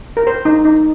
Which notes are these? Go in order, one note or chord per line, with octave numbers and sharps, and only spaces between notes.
A#4
C5
D#4
D#4